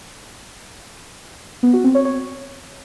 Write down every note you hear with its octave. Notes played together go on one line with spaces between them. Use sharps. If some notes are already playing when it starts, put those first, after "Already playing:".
B3
F#4
C4
C#5
C#5